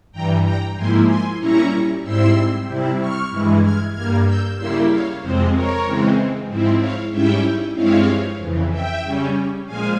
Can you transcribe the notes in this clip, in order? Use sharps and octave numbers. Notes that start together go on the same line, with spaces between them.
G2 E3 G3 G5 A#5
G5 A#5
G#2 F3 A#3 E4 G#5 C6
G#5 C6
A#2 G3 C#4 E4 A#5 C#6
G#2 G3 C4 E4 C6 E6
C3 G3 C4 E4
C#6 F6
G2 E3 G#3 E4
F6 G#6
G2 G3 A#3 F6 G#6
E6 G6
C#3 G3 A#3 E4 C6 E6
C#5 F5
F2 C3 F3 G#3 C4 C5
A#4 C#5
C#3 E3 G#3 C4
G#2 F3 C4 E4
C#5 F5
G#2 G3 C#4 E4 E5 G5
G2 F3 G#3 C4 E4 C#5 F5
F2 C#3 E3
E5 G5
C#3 G3 C#4
A#2 F3 G#3 F5 G#5